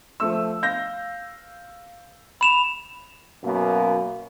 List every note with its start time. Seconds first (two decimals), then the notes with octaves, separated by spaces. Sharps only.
0.20 F3 A3 E6
0.62 F5 G6 A#6
2.41 B5 E7 F7
3.44 F#2 B2 A#3